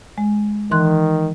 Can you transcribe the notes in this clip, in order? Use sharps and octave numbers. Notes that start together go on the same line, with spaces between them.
G#3
D#3 E3 C6 F#6